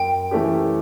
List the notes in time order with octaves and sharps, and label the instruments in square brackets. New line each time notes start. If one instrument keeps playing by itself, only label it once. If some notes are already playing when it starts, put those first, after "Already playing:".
Already playing: [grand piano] F#2 [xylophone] G5
[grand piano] E3 A3 C#4 G4